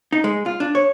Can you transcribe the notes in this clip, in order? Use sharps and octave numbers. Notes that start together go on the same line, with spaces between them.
D#4
G#3
F4
D4
C#5